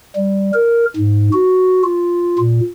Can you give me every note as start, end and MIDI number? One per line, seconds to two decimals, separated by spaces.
0.16 0.51 55
0.53 0.85 70
0.96 1.29 44
1.33 1.83 66
1.84 2.38 65
2.38 2.60 46